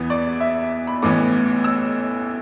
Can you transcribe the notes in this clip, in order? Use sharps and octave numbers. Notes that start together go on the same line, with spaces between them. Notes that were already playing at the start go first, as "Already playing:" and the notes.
Already playing: E2 E3 B3
D5
E5
B5
A1 A2 E3 B3 D6
E6